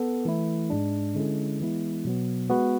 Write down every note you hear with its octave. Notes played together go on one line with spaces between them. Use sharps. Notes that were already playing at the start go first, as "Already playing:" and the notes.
Already playing: B3 A4
E3 A3 E4
G#2 G#3 D4
D3 G#3 C#4 E4 A4
E3 G#3 B3 E4
B2 F#3 B3
G#3 B3 F#4 B4